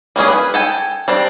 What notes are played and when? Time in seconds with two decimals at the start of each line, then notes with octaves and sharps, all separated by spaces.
0.16 G3 A#3 C#4 G#4
0.28 B4
0.54 A4 G5 G#5
1.08 G3 C4 D4